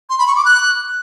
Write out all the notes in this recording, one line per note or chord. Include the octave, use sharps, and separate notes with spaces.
C6
B5
C#6
D6
F#6